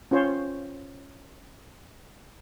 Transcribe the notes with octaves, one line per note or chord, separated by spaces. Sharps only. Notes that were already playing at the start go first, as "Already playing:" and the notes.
C#4 F4 C5 C#5